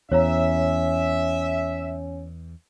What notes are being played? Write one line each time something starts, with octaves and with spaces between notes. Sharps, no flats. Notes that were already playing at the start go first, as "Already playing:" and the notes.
E2 C#4 C#5 E5 F5 A#5